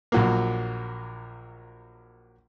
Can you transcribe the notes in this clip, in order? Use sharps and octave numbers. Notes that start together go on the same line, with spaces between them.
A#1 F#3 A#3